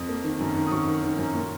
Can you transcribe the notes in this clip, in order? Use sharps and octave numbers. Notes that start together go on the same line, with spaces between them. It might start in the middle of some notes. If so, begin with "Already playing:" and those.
Already playing: F2 D#6
A#3
D#3
F#2
D#3
D#6
F#2 C#6
D#3
D#3
F#2
A#2